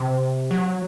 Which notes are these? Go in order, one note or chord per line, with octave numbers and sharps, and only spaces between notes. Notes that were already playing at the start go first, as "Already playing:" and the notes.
Already playing: C3
F#3